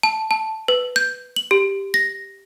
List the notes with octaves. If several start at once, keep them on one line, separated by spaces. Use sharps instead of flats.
A5
A5
B4
G6
F#7
G4
A#6